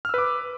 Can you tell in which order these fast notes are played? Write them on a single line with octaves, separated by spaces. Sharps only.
F6 E6 B4 D6